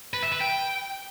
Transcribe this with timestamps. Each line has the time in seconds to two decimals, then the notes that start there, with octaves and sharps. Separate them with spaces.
0.14 B4
0.23 E5
0.32 B4
0.40 G5